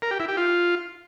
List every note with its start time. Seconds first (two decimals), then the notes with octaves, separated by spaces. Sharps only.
0.02 A#4
0.11 G4
0.20 E4
0.28 G4
0.37 F4